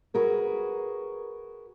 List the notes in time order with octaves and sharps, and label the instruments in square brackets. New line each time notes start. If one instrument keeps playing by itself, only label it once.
[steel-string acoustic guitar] F#4 G#4 A#4 B4